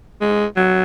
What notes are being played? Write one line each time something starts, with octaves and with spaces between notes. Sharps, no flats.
G#3
F#3